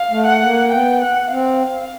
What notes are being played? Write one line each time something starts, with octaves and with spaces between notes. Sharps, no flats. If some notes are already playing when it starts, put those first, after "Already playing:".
Already playing: F5
A3
F#5
A#3
B3 G5
F#5
C4 F5